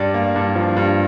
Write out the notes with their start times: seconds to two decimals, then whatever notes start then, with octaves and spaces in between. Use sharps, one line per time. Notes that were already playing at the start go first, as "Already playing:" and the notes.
Already playing: G2 D5
0.14 A#3
0.36 G2
0.56 F3
0.77 G2